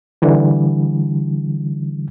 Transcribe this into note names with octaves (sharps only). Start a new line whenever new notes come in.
D3 E3 G3